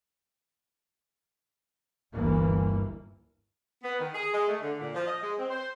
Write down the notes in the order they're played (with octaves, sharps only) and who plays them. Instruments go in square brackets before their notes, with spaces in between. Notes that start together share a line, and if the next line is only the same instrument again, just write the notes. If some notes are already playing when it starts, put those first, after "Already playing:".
[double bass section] G1 D2 E3 A#3
[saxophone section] B3
D#3
G#4
G#3
A3
D3
A#2
F3
D#5
G#3
C4
C5